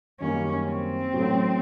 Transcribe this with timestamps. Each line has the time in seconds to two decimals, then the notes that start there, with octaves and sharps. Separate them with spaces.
0.20 F#2 D#3 G3 A#3 C#4
0.67 C4
1.14 A1 A2 F#3 B3